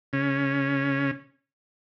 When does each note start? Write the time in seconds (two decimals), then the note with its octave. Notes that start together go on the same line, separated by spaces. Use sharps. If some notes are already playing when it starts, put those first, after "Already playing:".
0.13 C#3 C#4